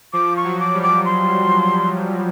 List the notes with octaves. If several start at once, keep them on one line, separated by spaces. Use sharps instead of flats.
F3 D6
C#6
F#3
D6
G3
D6
C6